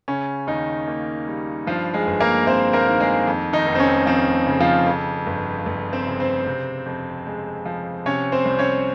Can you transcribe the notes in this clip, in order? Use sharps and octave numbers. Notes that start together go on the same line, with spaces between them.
C#3 C#4
D#2 D#3 D#4
A#3
G3
G2 F3 F4
G#3 G#4
G1
A#3 A#4
A#3 C4 C5
A#3 A#4
D#3
G#3 G#4
F2
D#3 D#4
F1
C4
C#4
F3 C4
C#3
F3 F4
F2
G1
G1
C4 C5
C#3
C4 C5
C3
F2
G#3
F3
C3 C#4 C#5
C4 C5
C2
C#4 C#5